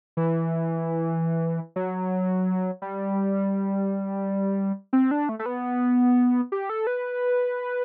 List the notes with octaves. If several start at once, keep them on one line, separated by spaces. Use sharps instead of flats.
E3
F#3
G3
C4
D4
A3
A3
B3
G4
A4
B4